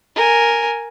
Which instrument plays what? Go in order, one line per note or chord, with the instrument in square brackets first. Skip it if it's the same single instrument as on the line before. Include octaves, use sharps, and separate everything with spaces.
[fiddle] A#4 G#5